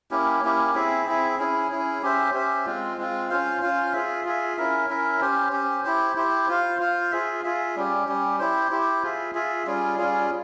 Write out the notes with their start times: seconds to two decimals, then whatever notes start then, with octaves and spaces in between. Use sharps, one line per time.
0.11 A#3 C#4 E4 G4
0.43 A#3 C#4 E4 G4
0.75 C4 E4 G#4 E5
1.06 C4 E4 G#4 E5
1.39 C#4 E4 G#4
1.71 C#4 E4 G#4
2.03 C#4 G4 C5 E5
2.34 C#4 G4 C5 E5
2.66 G#3 C4 F4
2.97 G#3 C4 F4
3.29 C#4 F4 C5 F5
3.62 C#4 F4 C5 F5
3.93 F4 G#4 E5
4.25 F4 G#4 E5
4.57 C#4 E4 A#4 E5
4.88 C#4 E4 A#4 E5
5.21 C#4 G4 C5
5.52 C#4 G4 C5
5.84 E4 G4 C5
6.16 E4 G4 C5
6.48 F4 C5 F5
6.80 F4 C5 F5
7.12 F4 G#4 E5
7.44 F4 G#4 E5
7.76 G3 C#4 G4
8.07 G3 C#4 G4
8.39 E4 G4 C5
8.71 E4 G4 C5
9.03 F4 G#4 E5
9.35 F4 G#4 E5
9.66 G3 C#4 F4 G#4
9.98 G3 C#4 F4 G#4